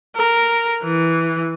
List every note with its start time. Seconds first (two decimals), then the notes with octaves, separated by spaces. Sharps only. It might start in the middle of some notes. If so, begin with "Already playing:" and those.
0.16 A#4
0.83 E3